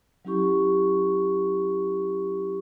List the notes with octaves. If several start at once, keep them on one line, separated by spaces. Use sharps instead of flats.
F#3 C#4 E4 G4 C#6